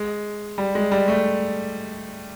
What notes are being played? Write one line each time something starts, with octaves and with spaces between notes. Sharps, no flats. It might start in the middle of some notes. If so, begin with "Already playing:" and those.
Already playing: G#3
G3
G#3
G3
A3